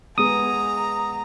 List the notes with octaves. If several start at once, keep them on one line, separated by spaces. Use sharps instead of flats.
G#3 B3 G#4 A#5 D#6